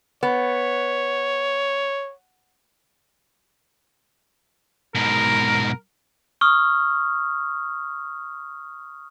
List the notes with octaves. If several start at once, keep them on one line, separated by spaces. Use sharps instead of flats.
B3 C#5
G#2 B2 A#4
C#6 D#6 F6